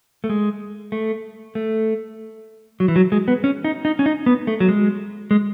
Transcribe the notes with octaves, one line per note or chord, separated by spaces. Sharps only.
A3
G#3
A3
A3
F#3
E3
F#3
G#3
B3
C#4
D#4
D#4
C#4
D#4
B3
A3
F#3
G#3
G#3